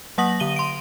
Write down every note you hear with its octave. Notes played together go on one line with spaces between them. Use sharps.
F#3 A#3 F#5 D#6 A#6 F#7
D3 D#7 G7
C6 D7